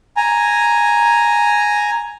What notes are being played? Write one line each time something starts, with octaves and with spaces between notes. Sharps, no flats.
G#5 A#5